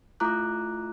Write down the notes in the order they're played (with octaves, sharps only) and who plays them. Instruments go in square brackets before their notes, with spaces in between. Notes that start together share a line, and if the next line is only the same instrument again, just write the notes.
[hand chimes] A3 E4 F4 A#5 D6 F#6